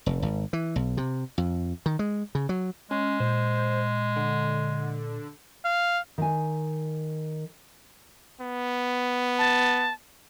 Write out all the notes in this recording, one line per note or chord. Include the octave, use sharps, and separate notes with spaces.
F1
G#1
E3
B1
C3
F2
D#3
G#3
C#3
F#3
G#3 C#4
A#2 C5
D3
F5
D#3 G#5
B3
A5